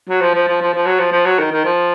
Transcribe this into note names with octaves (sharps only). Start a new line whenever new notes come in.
F#3
F3
F3
F3
F3
F3
F#3
F3
F3
F#3
D#3
D#3
F3